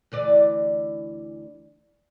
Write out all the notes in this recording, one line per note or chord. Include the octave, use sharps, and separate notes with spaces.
D2 E3 D5